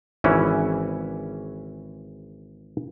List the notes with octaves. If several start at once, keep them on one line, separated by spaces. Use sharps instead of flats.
G#1 C#3 E3 C#4 E4